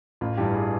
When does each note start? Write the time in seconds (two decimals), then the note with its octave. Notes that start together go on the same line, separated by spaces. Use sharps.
0.21 A1 F4
0.37 G2 E3 G4
0.54 G#4